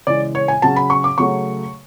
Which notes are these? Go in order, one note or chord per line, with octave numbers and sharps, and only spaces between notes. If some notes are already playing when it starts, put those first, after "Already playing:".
C#3 E3 G#3 D5
C#5
G#5
C#3 F#3 C#4 A5
B5
C#6
D6
C#3 F#3 A3 C#6